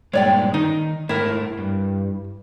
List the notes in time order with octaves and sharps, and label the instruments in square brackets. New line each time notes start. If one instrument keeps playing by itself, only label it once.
[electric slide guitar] G2 A#2 G#3 [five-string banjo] C#5 D5 G5
[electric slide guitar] D#3 [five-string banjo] D#4
[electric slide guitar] G#2 A3 [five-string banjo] E4 A#4
[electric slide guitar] G2